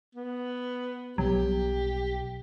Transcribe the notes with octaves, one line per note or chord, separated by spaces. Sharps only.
B3
B1 F#3 G3 B3 G4